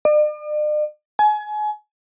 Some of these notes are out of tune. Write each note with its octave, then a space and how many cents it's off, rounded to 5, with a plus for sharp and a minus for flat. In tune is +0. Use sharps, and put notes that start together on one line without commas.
D5 +45
G#5 +30